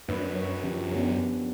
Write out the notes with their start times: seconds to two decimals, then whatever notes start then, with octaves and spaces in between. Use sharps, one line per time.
0.09 F#2 A#3 D4 B4
0.36 C#5
0.63 F3 C#4 G4
0.92 B3 D4 G4